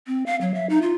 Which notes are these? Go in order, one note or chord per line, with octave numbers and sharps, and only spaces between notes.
C4
F5
F#3
E5
D#4
F4